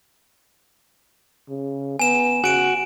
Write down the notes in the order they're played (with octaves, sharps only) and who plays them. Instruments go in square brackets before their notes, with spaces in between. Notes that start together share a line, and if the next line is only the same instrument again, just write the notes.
[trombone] C#3
[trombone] B3 [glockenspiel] G#5 E7
[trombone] C#3 [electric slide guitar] F#4 [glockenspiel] G#5 D7 E7